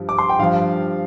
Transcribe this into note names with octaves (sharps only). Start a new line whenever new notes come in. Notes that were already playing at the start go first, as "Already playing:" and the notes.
Already playing: G2 F3
D6
C6
G5
G2 F3 F5